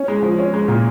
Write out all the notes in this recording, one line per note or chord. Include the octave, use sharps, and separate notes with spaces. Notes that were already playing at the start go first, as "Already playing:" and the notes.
Already playing: C#4
G#3
F3
C#4
G#3
A#2